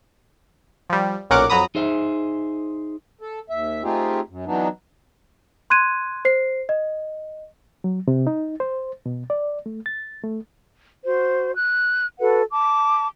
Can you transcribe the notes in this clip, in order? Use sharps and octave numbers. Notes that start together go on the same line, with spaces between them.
F3 G3
B1 A#2 C#4 A#4 F#5 D6
F2 F#3 A#5 B5 D#6
D#4 G#4 C5 E5
A4
D#2 E5
A3 C4 D#4 F4 G4 G#4
F#2
E3 F#3 B3 D4 D#4
C6 F#6 G#6 D#7
C5 C7
D#5
F#3
C3
D#4
C5
B2
D5
A3
A6
A3
F#4 C5
F#6
F#4 A4 B4 F#5
A5 D6